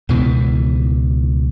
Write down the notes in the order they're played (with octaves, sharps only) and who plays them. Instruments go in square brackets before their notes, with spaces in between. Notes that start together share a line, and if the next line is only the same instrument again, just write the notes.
[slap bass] C#2 B2 D#3 E3